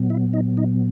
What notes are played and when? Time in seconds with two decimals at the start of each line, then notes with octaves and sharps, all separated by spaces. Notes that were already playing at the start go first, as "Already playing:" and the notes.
Already playing: A#2 F#3 B3
0.10 E4 E5
0.33 D#4 D#5
0.57 D#4 D#5